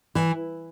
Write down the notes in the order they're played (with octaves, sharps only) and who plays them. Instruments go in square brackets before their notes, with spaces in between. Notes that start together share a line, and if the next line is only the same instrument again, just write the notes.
[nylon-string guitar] E3